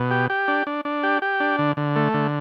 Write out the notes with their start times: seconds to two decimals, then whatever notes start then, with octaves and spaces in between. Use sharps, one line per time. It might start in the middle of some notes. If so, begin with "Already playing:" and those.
Already playing: B2
0.11 G4
0.30 G4
0.48 D4
0.67 D4
0.85 D4
1.03 G4
1.22 G4
1.40 D4
1.59 D3
1.77 D3
1.96 A3
2.14 D3